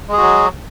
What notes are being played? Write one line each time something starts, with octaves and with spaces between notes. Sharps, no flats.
F#3 G#3 F#4 G#4